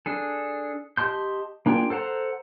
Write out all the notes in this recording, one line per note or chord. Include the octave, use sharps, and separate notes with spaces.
D4 G#4 A4
G4 D#5 A5 C6 G6
A#3 D4 F4 G#4 G5
A4 C5 F#5 A5 A#5